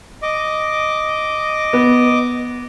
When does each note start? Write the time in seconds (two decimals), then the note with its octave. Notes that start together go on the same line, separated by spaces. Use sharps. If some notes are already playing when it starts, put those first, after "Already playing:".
0.22 D#5 D6
1.73 B3